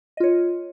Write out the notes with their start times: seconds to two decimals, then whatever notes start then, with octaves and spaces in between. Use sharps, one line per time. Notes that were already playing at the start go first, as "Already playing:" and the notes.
0.17 D#5
0.20 F4
0.23 C#5